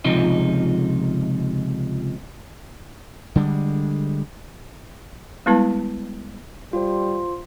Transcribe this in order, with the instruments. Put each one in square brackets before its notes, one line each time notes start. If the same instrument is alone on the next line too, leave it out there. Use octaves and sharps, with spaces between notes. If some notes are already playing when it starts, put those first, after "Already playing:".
[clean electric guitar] C#2 C3 F3 D#4
[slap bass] D3 G3 G#3
[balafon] G3 G#3 B3 E4 B4 A5
[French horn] G3 [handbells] F4 C5